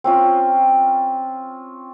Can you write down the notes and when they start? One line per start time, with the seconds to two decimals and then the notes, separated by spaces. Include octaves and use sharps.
0.04 C4 C#4 F4